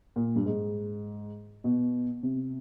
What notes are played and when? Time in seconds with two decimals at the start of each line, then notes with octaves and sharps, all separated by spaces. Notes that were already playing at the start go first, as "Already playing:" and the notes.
0.16 A#2
0.36 G2
0.46 G#2
1.64 B2
2.23 C3